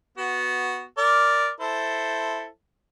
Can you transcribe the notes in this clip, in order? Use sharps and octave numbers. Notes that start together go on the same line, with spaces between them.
B3 F#4
A#4 D5
E4 A4 C5